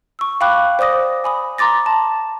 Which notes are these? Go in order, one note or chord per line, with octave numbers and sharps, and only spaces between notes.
C#6 E6
F5 G5 B5 D6 F#6
C5 D5 D6 D#6 A#6
G#5 B5 D#6
A#5 C6 D6 A6 A#6
A5